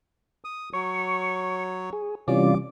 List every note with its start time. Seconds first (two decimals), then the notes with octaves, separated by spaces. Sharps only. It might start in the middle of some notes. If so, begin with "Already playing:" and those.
0.45 D#6
0.73 F#3 C#5 C#6
1.93 G#4
2.28 C3 E3 G3 C#4 F4 D5 D6